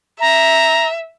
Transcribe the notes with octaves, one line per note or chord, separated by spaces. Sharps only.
E5 A#5